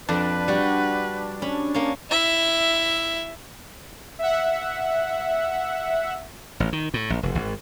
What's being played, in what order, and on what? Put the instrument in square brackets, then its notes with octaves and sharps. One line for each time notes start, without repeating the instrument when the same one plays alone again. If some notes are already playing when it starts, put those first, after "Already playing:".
[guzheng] F2 [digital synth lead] D4 [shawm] B4
[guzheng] G3 F#4
C#4 B5
A#3 C#4
[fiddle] E4 E5
[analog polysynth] E5 F#5
[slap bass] A1
D#3
A2
A#1
F1
G#1